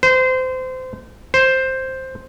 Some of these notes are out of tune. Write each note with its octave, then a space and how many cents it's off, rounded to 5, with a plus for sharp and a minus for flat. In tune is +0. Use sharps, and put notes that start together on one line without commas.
C5 -25
C5 +5